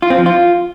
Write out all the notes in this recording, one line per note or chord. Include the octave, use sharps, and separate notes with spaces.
F4
C4
F3
F4